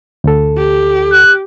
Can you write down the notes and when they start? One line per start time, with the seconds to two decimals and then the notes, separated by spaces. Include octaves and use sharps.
0.24 D2 A4
0.57 G4
1.12 F#6